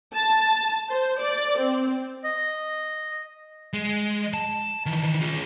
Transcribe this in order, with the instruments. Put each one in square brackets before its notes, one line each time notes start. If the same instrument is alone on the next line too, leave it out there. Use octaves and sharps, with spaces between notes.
[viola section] A5
C5
D5
C4
[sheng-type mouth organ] D#5
[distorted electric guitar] G#3
A5
D#3 E3
F4 G#4